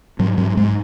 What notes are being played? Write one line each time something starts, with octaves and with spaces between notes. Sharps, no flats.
G#2 F#3
G#2 F#3
G#2 G#3